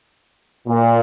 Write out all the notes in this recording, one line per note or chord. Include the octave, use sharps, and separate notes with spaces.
A#2